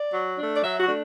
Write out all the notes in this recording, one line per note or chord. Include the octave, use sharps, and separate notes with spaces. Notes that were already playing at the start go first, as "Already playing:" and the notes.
Already playing: D5
F#3
A3 D4
D5
F#3 E5
F#4
A3 D4